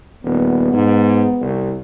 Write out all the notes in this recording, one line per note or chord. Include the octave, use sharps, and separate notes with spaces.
D#1 B3
G#2
C2